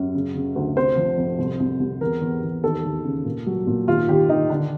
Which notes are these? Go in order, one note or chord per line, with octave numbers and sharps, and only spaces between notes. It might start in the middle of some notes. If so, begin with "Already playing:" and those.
Already playing: F#2
C#3
C#3
D2
C3 C5
F3
F2
C2
C2
C2
E2 A#4
E2
E2
D#2 A4
D#2
C#3
A#2
F#3
A#2
D#2 F4
D#2 G4
D#3 D#4
D3 D4